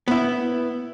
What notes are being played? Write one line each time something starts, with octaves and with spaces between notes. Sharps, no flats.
B3 E4